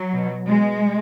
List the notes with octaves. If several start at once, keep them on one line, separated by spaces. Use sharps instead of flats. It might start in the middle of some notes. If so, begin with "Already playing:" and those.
Already playing: F#3
B2
B2 G#3